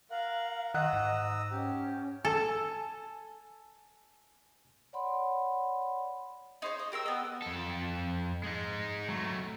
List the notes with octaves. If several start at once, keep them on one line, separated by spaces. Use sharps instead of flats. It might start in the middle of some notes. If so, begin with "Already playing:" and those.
A#4 F5 F#5
D#3 D#5 F#5 A#5 D#6 E6 F#6
G#2
C#4 G4
A4 G#5 A5 E6
C#5 D5 F#5 B5 C6
D#4 C5 C#5
D#5
G4 A#4 C6 E6
B3 D#5
F2 A4
G#3 D#4
F#3 A3